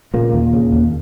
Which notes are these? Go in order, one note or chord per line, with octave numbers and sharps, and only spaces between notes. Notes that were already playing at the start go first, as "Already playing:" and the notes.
A#2 C#3 A#3
D#2
C#3
D#2